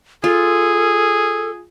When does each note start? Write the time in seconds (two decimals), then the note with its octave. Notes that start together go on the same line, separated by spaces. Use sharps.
0.24 F4 G#4 A4